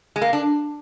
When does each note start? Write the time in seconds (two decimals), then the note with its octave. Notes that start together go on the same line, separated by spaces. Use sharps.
0.16 G#3
0.22 A#3
0.33 D4